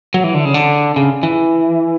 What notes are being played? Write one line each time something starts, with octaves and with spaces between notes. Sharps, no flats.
F#3
E3
D3
C#3
D3
C#3
E3